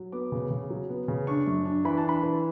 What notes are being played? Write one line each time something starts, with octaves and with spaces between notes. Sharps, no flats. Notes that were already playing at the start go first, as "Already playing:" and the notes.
Already playing: F#3
B3 D6
C#3
C#3
F#3
B3
C#3
D4 C#6
F#2
D4
E3 B5
A5
D4
B5
E3